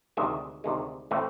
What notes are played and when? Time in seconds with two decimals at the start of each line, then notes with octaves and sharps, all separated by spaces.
0.17 D2 C3 D#3 G#3 E5
0.64 D2 C3 D#3 G#3
1.11 A2 E3 A3 C4